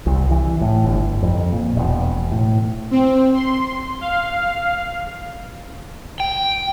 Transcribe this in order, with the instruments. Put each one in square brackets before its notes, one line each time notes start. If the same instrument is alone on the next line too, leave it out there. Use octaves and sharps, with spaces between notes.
[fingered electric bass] C2
E3
A2
G1
F2
A#2
E1
A2
[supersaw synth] C4
C6
F5
[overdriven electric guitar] G5